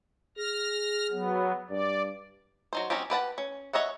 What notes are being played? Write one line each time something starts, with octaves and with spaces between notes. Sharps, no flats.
G#4 F6 A#6
F#3 B3
G2 D5
F#3 D#4 C5
F#3 C4 C#4 D#4 G4
G4 B4 F#5 A5
C#4
C#5 D#5 E5 F#5